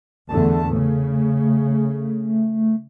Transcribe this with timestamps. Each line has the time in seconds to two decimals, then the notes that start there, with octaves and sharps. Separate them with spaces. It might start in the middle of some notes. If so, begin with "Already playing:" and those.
0.29 E2 D3 A3 A5
0.72 C#3 A3